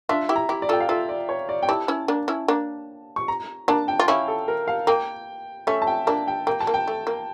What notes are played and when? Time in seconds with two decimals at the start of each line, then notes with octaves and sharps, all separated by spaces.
0.09 D4 F4 E5
0.29 E4 G4
0.36 A#5
0.49 E4 G4
0.62 D5
0.69 F4 A4 G5
0.80 F5
0.89 F4 A4 E5
1.09 D5
1.29 C#5
1.49 D5
1.63 G5
1.69 E4 G4 A5
1.88 C#4 E4
2.08 A#3 D4
2.28 C#4 E4
2.48 A#3 D4
3.16 C#6
3.28 A#5
3.68 A#3 D4 A5
3.88 G5
3.99 F4
4.08 C#4 E4 F5
4.28 A4
4.48 A#4
4.68 F5
4.87 A#3 G5
5.67 A3 C#4 E5
5.82 A5
5.87 G5
6.07 A#3 D4 A5
6.28 G5
6.47 A#3 G5
6.60 A5
6.67 A#3
6.74 G5
6.88 A3
7.07 A#3